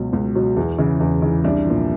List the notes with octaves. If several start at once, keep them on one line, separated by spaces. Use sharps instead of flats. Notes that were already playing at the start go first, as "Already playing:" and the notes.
Already playing: C#2 B2 F#3
C#2
B2 F#3
E2
C#3 E3
E2
C#3 E3
C2 D4
A#2 F3